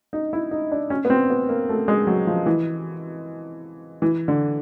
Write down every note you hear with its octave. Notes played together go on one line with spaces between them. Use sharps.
D#4
E4
D#4
D4
C#4
B3
C4
B3
A#3
A3
G#3
F#3
F3
E3
E3
D3